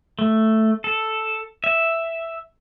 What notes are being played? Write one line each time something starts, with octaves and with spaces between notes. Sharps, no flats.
A3
A4
E5